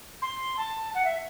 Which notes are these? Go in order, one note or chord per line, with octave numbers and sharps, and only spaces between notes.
C6
A5
F#5
E5